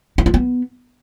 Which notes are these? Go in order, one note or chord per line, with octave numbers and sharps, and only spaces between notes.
E4
F4
B3